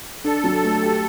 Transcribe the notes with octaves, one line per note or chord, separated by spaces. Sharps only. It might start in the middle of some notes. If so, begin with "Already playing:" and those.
D4 A4
F#3
A3
G4